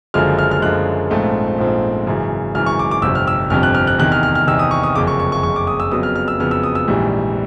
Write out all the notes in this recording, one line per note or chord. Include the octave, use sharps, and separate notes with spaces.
F#1 F#2 D3 F3 G#3 F6
F6
F6
F#1 F#2 D3 F3 G#3 F#6
A#1 G#2 F3 A3 C4
A#1 G#2 F3 A3 C4
G#1 F#2 C#3 E3
G#1 F#2 C#3 E3 F6
C#6
D6
D6
G1 F2 C3 E6
F6
E6
G1 F2 C3 F6
F#6
F6
F#6
E2 C3 D#3 F#6
F6
F6
F6
E2 C3 D#3 E6
D#6
C#6
D#6
F#1 F2 C#3 D6
C#6
C#6
C#6
F#1 F2 C#3 C#6
D6
D#6
E6
F2 C#3 F#3 B3 D#6
F6
F6
E6
F2 C#3 F#3 B3 F6
E6
D#6
E6
A#1 G#2 E3 G3